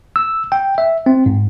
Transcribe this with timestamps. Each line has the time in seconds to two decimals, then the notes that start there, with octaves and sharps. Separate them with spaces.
0.16 E6
0.52 G5
0.78 E5
1.06 C4
1.26 G#2